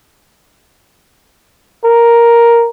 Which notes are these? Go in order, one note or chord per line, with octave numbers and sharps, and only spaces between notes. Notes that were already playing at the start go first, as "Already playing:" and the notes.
A#4